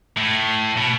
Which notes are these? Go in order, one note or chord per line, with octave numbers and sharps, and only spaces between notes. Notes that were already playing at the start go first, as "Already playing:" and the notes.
A2
B2